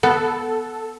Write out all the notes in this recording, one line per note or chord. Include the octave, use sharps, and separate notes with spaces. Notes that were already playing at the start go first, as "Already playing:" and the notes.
B3 A4